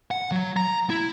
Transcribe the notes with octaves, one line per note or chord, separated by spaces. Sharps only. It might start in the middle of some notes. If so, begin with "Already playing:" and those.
F#5
F#3
A#5
E4